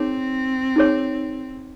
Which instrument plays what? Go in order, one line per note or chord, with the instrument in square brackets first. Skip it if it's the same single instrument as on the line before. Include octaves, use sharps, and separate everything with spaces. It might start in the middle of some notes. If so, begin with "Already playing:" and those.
Already playing: [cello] C4 [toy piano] D#4 G#4 C#5
[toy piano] D#4 G#4 C#5